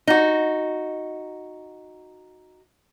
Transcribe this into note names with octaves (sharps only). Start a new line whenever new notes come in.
D#4 F#4